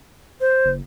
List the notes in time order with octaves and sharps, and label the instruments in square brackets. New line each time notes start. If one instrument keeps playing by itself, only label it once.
[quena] C5
[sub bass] F#1